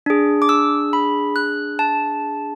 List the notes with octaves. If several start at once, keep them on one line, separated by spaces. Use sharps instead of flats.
D4 G#4
D6
E6
B5
F#6
A5